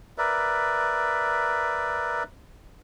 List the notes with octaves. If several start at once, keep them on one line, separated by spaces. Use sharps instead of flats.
A#4 B4 D5 E5